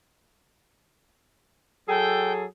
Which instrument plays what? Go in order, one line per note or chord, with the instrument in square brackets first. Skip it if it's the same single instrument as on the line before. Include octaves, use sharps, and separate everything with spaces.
[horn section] F#3 G#4 A4 [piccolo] G5